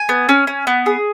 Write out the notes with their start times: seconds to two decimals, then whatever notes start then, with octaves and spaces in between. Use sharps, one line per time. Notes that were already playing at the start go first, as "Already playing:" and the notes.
Already playing: G#5
0.09 B3
0.29 C#4
0.47 C#4
0.67 B3
0.86 G#4